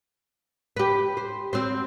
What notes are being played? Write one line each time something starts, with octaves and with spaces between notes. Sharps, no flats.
G4 B4
C5
C4 F#4 C5